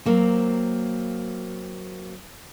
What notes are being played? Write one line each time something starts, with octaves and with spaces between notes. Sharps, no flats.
F#3 A#3 C4